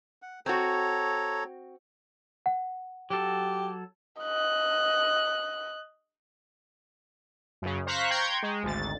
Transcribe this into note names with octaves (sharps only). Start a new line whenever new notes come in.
F#5
C4 F#4 A4 C#5 A#5
F#5
F#3 G4 A4
D#5 F#6
F#2 C#3
C5 F5 A#5 C#6 F#6 B6
G5 A#5 C6 C#6 G6 G#6
G#3
G#1 D2 A6